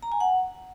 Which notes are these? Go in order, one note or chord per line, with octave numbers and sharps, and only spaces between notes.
A#5
G#5
F#5